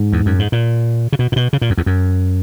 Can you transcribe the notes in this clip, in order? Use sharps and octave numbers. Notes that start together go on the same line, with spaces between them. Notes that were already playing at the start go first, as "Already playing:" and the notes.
Already playing: G#2
E2
F#2
G#2
A#2
C#3
B2
A#2
B2
C#3
A#2
F#2
E2
F#2